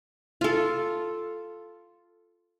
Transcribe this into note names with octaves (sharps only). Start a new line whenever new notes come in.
F4 A4